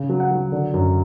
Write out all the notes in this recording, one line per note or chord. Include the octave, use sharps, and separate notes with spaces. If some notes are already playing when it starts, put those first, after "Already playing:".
Already playing: C#3
F#3
F#5
F#3
D3
F#2